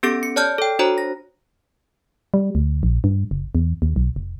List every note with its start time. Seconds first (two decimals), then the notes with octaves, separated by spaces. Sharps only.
0.03 B3 C#4 G4 A4 A#6 D7
0.23 C#7
0.36 C#5 D5 A5 F6 G6
0.58 A4 G5
0.79 D4 F#4 C5 C#5 A#5
0.98 A#6
2.34 G3
2.55 D2
2.83 A#1
3.04 G2
3.31 F#1
3.55 E2
3.82 D#2
3.96 B1
4.16 F1